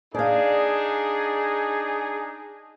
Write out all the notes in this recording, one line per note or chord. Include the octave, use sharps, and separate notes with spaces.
D4 D#4 G#4 D5 F5